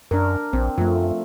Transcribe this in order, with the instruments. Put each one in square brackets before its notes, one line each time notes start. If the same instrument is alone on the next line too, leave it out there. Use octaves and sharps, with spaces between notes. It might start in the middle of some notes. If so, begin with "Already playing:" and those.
[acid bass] F#2 [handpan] D4 A#4
[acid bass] A#1 [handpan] C4
[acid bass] F#2 [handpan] F3 A3